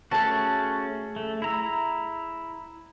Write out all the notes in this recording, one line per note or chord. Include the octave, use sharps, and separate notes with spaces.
A3 C#4 F#4 G#4 A5
A3
E4 A#5 E6